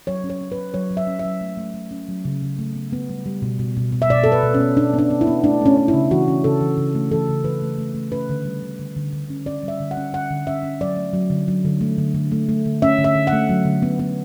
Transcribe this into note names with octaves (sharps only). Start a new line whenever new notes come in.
F#3 C#5
C#4
C#5
C#4
B4
F#3
F#3 C#5
F#3
E5
C#4
E5
F#3
A3
A3
A3
C#4
F#3
C#3
C#3
A3
B3
B3
G3
G3
B2
B2
B2
B2
E5
B2 D5
B3 A4
B4
B2
C#4
B3
B2 D4
B3 D4
B3
E4
B3
A3 D4
A3 C#4
C#4
E4
C#3
E3 F#4
C#4
C#3 A4
E3
C#3
A3
E3 A4
C#3
E3 B4
A3
A3
A3
C#4 B4
D3
G3
D3
D3
D3
D3
C#4
C#4 D5
G3 E5
D3
F#5
C#4
D3 F#5
D3
C#4 E5
C#4
F#3 D5
A3
F#3
D3
F#3
D3
A3
D3
D3
A3
A3
D3
C#4 E5
D3
E5
D3
F#5
A3
F#3
D3
B3
B3